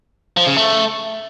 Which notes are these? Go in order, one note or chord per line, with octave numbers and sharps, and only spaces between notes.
F3
C#3
A3